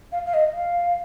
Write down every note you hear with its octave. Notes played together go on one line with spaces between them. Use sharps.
F5
F5
D#5
F5